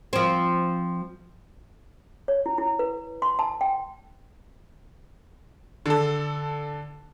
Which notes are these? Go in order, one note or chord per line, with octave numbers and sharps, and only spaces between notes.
F3 C4
C#5
E4
E4
B4
C6
A5
G5
D3 A4